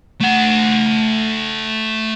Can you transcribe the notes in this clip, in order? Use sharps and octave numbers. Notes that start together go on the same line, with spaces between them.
A3 F#5